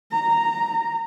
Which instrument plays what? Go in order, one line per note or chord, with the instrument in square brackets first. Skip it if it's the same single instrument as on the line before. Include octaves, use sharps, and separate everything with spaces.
[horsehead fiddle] A#5